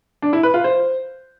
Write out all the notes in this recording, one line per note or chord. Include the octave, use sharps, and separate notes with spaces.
D4
E4
B4
F4
C5